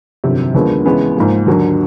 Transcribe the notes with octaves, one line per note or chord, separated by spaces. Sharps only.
G1 F2 C3 D#3 F#3
D#2 D3 F3 G#3 B3
C#2 C#3 E3 G#3 B3
G#2 F3 A#3
D#2 D3 F#3